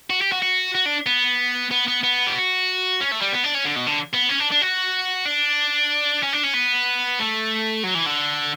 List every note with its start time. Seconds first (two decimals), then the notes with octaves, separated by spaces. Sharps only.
0.10 F#4
0.21 G4
0.32 F#4
0.42 F#4
0.75 F#4
0.86 D4
1.07 B3
1.71 B3
1.88 B3
2.04 B3
2.27 G4
2.35 F#4
3.00 C#4
3.11 A3
3.21 G3
3.32 B3
3.44 D4
3.54 C#4
3.65 D3
3.76 B2
3.86 D3
4.13 B3
4.29 C#4
4.39 D4
4.51 D4
4.61 F#4
5.25 D4
6.23 C#4
6.33 D4
6.44 C#4
6.54 B3
7.19 A3
7.83 F#3
7.94 E3
8.06 D3